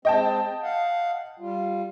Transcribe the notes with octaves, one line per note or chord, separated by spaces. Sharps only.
G#3 C4 D#5 G5 A5
F5 F#5
G3 F4